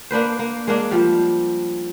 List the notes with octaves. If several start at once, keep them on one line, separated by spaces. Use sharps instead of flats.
A#3 D4 B4 C5
A#3
G#3 A#3 D4
F3 G3